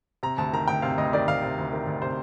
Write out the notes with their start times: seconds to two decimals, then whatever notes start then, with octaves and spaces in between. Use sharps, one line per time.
0.23 C3 A#5
0.38 D2 A5
0.53 D#3 A#5
0.68 D2 G5
0.82 C3 F5
0.98 D2 D#5
1.13 D#3 D5
1.28 D2 F5
1.42 C3
1.58 D2
1.73 D#3
1.87 D2
2.02 C3 C5